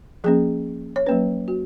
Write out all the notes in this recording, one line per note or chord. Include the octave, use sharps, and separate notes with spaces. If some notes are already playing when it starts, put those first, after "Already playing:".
F3 A#3 C#4 G#4
C#5
F#3 A#3 C#4 B4
F#4